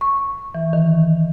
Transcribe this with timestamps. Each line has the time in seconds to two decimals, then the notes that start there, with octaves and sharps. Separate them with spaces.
0.01 C#6
0.55 E3
0.73 D#3